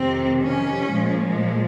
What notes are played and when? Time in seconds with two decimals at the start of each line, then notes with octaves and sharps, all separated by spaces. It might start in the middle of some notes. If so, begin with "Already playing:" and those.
Already playing: F2 C3 D#3 C4
0.41 C#4
0.91 A#2 F3 G#3